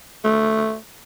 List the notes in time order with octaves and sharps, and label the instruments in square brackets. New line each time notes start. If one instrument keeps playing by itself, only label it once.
[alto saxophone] A3